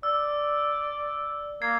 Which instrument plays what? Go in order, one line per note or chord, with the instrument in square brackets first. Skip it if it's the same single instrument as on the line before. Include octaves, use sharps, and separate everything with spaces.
[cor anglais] D5 [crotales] E6
[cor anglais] A#3 [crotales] G#6 C7